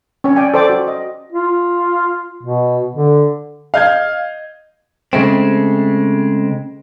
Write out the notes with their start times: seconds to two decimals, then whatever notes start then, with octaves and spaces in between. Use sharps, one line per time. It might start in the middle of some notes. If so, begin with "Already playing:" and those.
0.24 C#4 C#5
0.36 D5 G5 G#5
0.54 A4 C5 D5 G5 D6
0.69 F#4
0.87 D#5
1.32 F4
2.43 B2
2.95 D3
3.74 D#5 F5 G6 G#6
5.13 C#3 G#3 A3 C4